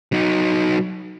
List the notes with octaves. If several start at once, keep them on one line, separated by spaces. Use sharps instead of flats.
F#3 D#4